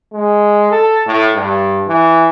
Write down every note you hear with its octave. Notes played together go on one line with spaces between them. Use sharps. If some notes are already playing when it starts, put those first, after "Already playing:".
G#3
A4
A2
G2
E3